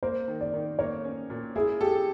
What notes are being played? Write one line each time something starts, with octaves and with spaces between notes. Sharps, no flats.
A#3 C5
D#3
D5
D#3
A#3 C#5
C#4
A#2
E4 G#4
G4 A4